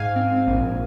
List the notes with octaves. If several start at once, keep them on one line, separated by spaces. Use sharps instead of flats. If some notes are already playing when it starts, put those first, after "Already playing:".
Already playing: G#2 F5 G#5
C4
A#1